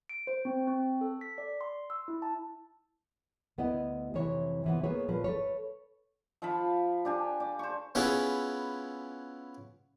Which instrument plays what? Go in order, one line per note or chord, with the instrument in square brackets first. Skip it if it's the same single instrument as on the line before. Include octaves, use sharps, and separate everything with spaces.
[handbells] D7
C5
C4
C4
A4
B6
D5
C6
E6
E4
A5
[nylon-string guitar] D2 B3 E4 D#5
F2 C3 E3 C#5
C3 E3 B3
A#3 B3 G#4 B4 C#5
A#2 F3 B4
A4 B4 C#5
[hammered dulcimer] F3 F5 A5 B5
D4 G4 G#5
D5
C5 C#6
[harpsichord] B3 C#4 E4 F4 G#4 B4